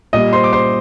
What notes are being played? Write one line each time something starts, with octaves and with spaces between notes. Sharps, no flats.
A#2 G3 D#5 D#6
C5 C6
D6
C5 C6